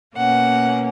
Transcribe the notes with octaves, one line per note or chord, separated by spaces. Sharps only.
B2 A#3 C#4 F#5